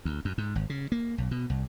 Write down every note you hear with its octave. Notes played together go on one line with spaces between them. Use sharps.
D2
F#2
G#2
G#1
C#3
A#3
B1
B2
C2